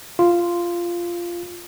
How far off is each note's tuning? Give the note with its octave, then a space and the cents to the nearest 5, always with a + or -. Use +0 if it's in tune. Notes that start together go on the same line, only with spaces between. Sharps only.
F4 -10